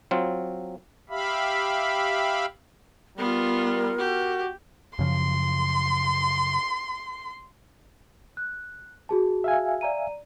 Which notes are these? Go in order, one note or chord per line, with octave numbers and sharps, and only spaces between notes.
F#3 C4 F4
G4 E5 F5 B5
G3 B3 F4 A#4
F#4 G4
F#2 C#3 F3 C6
F#6
F#4 G#4 A5
E5 F5 G#5
D5 A#5 D#7